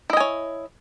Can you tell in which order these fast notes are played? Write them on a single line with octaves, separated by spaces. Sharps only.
E4 D#5 G#5 C#5